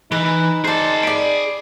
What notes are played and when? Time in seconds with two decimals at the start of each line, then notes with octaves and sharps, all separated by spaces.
0.12 E3 D#4 B4
0.65 G#4 C5 D5 A5 C7
1.03 D5 B5 D7